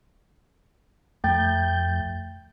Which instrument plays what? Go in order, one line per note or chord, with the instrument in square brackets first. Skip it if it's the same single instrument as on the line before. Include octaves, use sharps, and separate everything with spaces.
[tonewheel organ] F2 G6 [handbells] A3 G5 A6